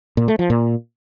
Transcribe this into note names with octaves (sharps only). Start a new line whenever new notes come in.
A#2
A3
F3
A#2